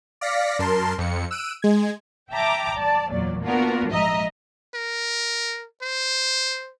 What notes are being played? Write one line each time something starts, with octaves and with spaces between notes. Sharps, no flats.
D5 F5 A#6 B6 C#7
F#2 A#4 A5 C6
F2 C#7
E6 F#6 D7 D#7
G#3 G#6
E5 G5 A5 A#5 D6
D5 A5
E2 A#2 F#3 D5
A#3 B3 D4 F4 F#4 A#4
A#1 G#2 D#5 E5 A#5
A#4
C5